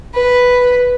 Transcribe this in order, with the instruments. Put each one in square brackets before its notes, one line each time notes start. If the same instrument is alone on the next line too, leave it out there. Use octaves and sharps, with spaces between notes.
[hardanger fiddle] B4